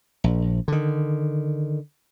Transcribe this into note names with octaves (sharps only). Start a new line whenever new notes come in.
A#1
D3 D#3